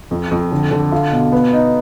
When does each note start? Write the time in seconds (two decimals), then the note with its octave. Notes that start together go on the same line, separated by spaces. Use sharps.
0.11 F2
0.31 F2
0.52 D3
0.71 D3
0.92 F4
1.12 B2
1.32 B3
1.53 D#4